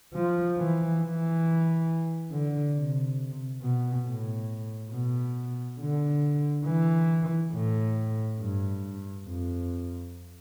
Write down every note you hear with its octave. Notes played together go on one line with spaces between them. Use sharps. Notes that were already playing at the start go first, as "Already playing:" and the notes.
F3
E3
E3
D3
C3
B2
A2
B2
D3
E3
A2
G2
F2